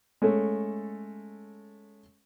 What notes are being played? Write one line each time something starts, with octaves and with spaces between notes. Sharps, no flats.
G#3 A3 C#4 A4